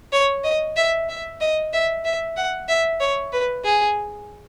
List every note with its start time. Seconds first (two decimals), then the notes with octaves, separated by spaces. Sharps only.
0.13 C#5
0.44 D#5
0.76 E5
1.09 E5
1.41 D#5
1.73 E5
2.05 E5
2.36 F#5
2.68 E5
3.00 C#5
3.32 B4
3.64 G#4